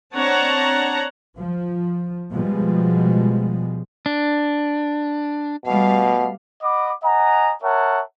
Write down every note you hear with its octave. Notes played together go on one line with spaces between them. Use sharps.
C4 D4 C#5 F#5 A5 A#5
F3
B2 F3 G3 G#3
D4
B2 G3 A3 F5
D#5 F#5 B5 D6
D#5 F#5 G#5 A#5
A#4 C#5 E5 F#5 A5